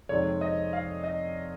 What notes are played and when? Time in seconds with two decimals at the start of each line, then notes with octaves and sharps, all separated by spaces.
0.09 F2 C3 D#3 G#3 C#5
0.41 D#5
0.73 F5
1.04 D#5